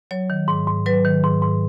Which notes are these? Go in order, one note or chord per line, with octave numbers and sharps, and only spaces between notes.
F#3 C#5
D#3
G#2
G#2
F#3 B4
D#3
G#2
G#2